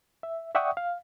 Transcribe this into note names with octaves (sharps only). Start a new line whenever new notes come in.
E5
D5 E5 F#5 G5 C#6 D#6
F5